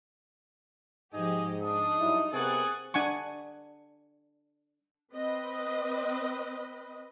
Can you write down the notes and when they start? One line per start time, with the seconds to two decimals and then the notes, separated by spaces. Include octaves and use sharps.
1.14 G#2 F3 D#4 G4 G#4 D#5
1.62 D4 D#6
1.99 G2 F#3 E4
2.33 C3 B3 C4 G#4 A#4 C#6 F#6 A6
2.94 D4 F#5 G#5 C#6
5.15 C4 B4 D#5